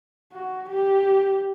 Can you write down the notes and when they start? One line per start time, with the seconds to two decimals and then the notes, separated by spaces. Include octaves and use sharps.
0.33 F#4
0.70 G4